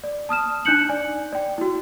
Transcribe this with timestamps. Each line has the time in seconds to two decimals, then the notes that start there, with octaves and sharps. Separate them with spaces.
0.04 D5
0.29 A5 D#6 F6 E7
0.65 D4 D#4 F#6 G6 C#7 F#7
0.89 D5 G#5
1.33 D5 G5
1.58 E4 F#4